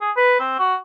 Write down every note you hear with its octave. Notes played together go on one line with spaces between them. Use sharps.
G#4
B4
C4
F#4